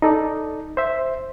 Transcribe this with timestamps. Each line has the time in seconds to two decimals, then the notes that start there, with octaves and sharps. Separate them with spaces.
0.02 D#4 A4 D5
0.77 C5 E5